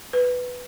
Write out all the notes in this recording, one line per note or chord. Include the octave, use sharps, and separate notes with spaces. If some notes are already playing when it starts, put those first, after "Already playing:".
B4